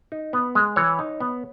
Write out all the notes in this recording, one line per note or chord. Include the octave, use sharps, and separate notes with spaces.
D#4
B3
G#3
E3 C#5
D#4
B3